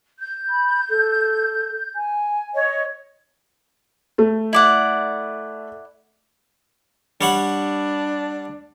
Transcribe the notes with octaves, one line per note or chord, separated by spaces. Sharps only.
G6
B5
A4
G#5
C#5 D#5
A3
E4 D5 F#5
G3 D4 C#5 F#5